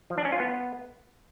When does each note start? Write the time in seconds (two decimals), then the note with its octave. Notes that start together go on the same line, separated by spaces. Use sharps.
0.10 F3
0.18 D4
0.25 C#4
0.32 F4
0.40 B3